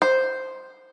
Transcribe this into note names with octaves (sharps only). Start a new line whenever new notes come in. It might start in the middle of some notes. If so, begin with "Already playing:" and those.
C5